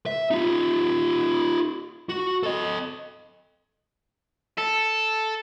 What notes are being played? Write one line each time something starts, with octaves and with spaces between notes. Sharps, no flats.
E5
D#4 F4
F#4
A4 D#5
A4